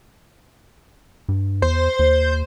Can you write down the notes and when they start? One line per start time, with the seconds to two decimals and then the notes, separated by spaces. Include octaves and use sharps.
1.29 G2
1.62 E2 C5
1.99 D#2